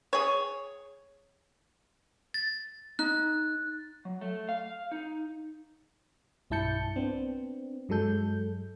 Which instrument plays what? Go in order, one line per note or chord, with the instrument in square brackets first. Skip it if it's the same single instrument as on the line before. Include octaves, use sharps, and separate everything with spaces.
[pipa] G#4 C#5
[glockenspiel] A6
[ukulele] D#4 [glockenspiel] F#6
[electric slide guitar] F#3
A3
F5
D#4
[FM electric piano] B1 G2 E4 A5 G6 C#7
B3 C4 D4
G2 F#3 G#3 A4 G6